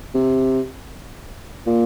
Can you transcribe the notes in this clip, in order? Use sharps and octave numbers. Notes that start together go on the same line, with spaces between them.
C3
A#2